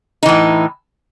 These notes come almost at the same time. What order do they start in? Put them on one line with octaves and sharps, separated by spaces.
D#4 E3 A2